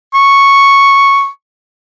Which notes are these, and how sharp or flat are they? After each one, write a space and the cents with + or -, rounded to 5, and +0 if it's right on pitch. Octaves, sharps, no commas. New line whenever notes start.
C#6 -5